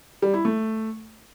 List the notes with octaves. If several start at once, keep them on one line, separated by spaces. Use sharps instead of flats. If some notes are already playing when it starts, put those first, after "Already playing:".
G3
E4
A3